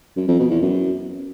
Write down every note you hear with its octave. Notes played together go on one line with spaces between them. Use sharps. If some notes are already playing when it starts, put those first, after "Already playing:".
F#2
F2
B2
E2
F#2